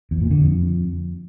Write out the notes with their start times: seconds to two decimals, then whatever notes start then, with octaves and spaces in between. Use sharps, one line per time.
0.11 E2
0.21 A#2
0.31 D3
0.41 F2